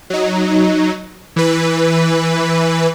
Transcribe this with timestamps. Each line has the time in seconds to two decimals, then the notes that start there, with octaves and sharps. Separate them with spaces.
0.10 F#3 D#4
1.36 E3 B4